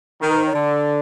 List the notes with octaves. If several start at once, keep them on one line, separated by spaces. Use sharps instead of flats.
D#3 A#4
B4
C5
C#5
D3 D5